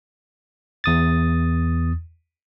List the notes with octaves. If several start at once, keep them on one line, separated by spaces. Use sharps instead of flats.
E2 D#6 A6